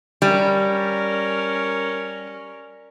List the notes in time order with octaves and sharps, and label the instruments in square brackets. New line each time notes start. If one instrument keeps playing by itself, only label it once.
[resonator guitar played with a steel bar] G3 [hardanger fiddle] C#4 A#4